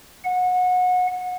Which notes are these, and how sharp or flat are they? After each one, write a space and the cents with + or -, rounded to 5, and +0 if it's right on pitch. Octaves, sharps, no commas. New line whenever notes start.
F#5 -25